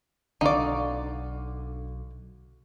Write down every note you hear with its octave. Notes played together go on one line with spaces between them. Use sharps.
B1 D3 D#4 D5 F5 C#6